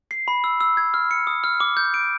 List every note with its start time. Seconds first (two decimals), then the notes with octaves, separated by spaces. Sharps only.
0.11 C7
0.28 B5
0.44 E6
0.61 E6
0.77 G#6
0.94 F6
1.11 C#7
1.27 D#6
1.44 F6
1.60 D6
1.77 G6
1.94 D7